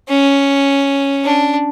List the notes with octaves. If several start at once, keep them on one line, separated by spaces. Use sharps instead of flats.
C#4
D4